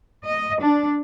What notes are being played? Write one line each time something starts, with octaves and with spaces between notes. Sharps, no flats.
D#5
D4